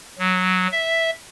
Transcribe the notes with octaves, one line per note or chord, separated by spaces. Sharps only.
F#3
E5